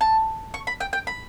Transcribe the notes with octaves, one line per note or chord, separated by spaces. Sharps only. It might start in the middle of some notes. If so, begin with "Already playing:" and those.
A5
C#6
B5
G5
G5
B5